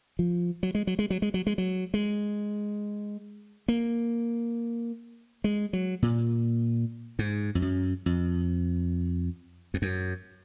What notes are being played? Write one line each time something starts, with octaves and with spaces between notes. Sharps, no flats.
F3
F#3
G#3
F#3
G#3
F#3
G#3
F#3
G#3
F#3
G#3
A#3
G#3
F#3
A#2
G#2
F2
F#2
F2
F2
F#2